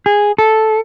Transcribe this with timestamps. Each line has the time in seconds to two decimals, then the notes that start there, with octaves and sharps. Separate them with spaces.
0.06 G#4
0.38 A4